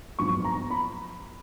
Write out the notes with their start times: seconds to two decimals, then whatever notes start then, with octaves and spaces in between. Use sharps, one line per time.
0.19 A#1 G#2 F#3 B3 C#6
0.44 A#5
0.70 B5